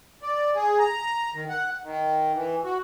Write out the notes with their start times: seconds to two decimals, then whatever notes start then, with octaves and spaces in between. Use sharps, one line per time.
0.23 D5
0.55 G#4
0.79 A#5
1.34 D#3
1.50 F#5
1.84 D#3
2.35 E3
2.65 F#4